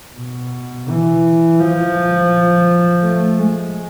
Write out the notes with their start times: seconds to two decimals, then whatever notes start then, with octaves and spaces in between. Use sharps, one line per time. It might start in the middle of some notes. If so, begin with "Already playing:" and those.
0.17 B2
0.89 E3
1.60 F3
3.03 A3
3.38 G#3